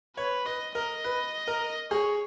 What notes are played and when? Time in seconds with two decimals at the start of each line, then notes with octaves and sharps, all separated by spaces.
0.17 B4 C#5
0.45 B4 D#5
0.75 A#4 D#5
1.04 B4
1.47 A#4
1.91 G#4 C#5